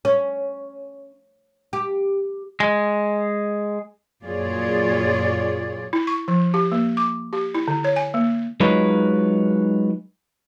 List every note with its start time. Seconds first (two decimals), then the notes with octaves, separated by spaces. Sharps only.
0.05 C#4
1.73 G4
2.60 G#3
4.24 F#2 A#2 F4 G#4 C#5 D5
5.93 E4
6.07 C#6
6.28 F3
6.54 G4
6.72 A#3
6.97 D6
7.33 G4
7.54 E4
7.68 D3
7.84 C#5
7.96 G#5
8.14 A#3
8.60 F#3 G#3 D#4 F4 B4 C#5